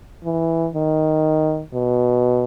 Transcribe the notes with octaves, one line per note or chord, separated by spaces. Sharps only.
E3
D#3
B2